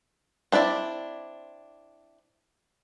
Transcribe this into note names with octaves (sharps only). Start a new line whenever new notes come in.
C4 D4 E4 D5